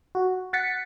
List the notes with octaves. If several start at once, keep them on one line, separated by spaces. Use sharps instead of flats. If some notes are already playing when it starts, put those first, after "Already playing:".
F#4
F#5 A6 B6 C#7